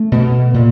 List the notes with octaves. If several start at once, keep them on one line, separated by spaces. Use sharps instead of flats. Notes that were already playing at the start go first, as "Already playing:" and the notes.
Already playing: A3
B2
A#2